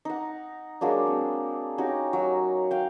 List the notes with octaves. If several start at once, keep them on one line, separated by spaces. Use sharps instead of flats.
D#4 F#5
F#3 G#3 A#3 D4
C4
C#4 D#4 F#4 G4
F#3
F5 G5